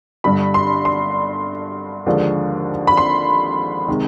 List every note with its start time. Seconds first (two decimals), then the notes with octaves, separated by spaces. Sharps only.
0.24 G1 G2 D3 G3 B5
0.54 C6
0.85 C6
2.06 D#2 D3 F3 G#3
2.87 B5
2.97 C6
3.88 C3 D#3 G#3